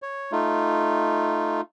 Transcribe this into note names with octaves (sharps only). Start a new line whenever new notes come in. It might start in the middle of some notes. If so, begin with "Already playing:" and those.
C#5
A3 D#4 F4